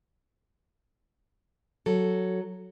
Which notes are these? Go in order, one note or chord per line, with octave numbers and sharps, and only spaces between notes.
F#3 A4